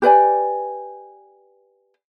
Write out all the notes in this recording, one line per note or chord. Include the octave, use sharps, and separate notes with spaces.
G4 B4 D5 G#5